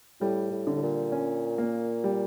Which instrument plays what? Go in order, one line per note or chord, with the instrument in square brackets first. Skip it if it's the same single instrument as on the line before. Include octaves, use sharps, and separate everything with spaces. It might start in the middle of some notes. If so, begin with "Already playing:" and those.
[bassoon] A2 [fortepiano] G3
[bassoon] A2
[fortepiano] D3
[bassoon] A2
A#2
[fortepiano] C#4
A#3
G3